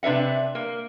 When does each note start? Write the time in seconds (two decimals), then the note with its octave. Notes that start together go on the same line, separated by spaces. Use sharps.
0.03 C3 D4 B4 E5 F#5
0.55 A#3